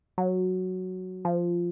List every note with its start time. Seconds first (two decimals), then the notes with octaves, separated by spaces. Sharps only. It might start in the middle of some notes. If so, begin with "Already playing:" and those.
0.18 F#3
1.25 F3